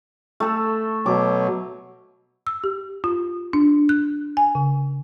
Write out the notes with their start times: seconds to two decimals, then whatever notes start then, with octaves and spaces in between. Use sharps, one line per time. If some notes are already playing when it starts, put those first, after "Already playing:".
0.40 A3 A4
1.06 B2 F#3 D6
2.47 E6
2.64 G4
3.04 F4
3.53 D4
3.89 F#6
4.37 G#5
4.55 C#3